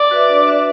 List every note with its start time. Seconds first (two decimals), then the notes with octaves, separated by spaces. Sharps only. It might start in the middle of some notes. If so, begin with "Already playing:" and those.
Already playing: D5
0.11 F#4 B4 E5
0.29 D4
0.47 F#4 B4 E5